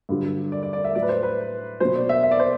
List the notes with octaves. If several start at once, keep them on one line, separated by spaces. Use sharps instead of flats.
G2 D3 F#3
D5
D5
D5
E5
A2 F#3 D5
B4
C5
B4
B2 F#3 C5
D5
E5
E5
D5
C5